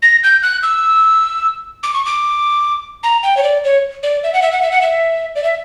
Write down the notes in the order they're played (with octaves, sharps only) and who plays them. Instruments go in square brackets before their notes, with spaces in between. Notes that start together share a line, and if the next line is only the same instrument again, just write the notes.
[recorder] A#6
G6
F#6
E6
D6
C#6
D6
A#5
G5
C#5
D5
C#5
D5
E5
F#5
E5
F#5
E5
F#5
E5
D5
E5